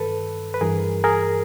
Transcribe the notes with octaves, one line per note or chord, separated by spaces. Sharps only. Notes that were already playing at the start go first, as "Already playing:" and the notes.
Already playing: G2 D#3 A4 B4
B4
G2 E3 G#4 A#4
G#4 A#4